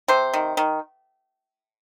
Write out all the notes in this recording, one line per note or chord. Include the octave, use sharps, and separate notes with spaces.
C3 C5
D#3
D#3